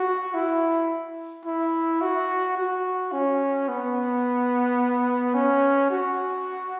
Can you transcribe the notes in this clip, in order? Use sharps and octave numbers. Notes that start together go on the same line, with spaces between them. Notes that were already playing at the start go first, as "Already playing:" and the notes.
Already playing: F#4
E4
E4
F#4
F#4
C#4
B3
C#4
F#4